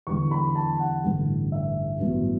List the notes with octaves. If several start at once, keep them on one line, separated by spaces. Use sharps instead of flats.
E2 D3 G3 C#6
B5
A5
F#5
A1 G2 D3 G3
E5
A1 G2 F#3 B3